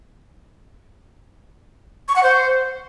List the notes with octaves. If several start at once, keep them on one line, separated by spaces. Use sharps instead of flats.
C#6
F#5
C5